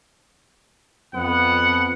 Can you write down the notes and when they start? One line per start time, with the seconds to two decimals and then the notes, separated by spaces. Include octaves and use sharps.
1.15 F2 B3 F#5